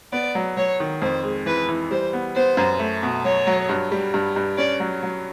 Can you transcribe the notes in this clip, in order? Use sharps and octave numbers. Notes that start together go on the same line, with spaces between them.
B3 D5
F#3
F#3 C#5
D#3
F2 C5
G#3
E3 B4
E3
G3 C5
B3
B3 C5
F#2
A3
B2
F#3 C#5
F#3
G2
G3
G2
G2
C#4 D5
F#3
F#3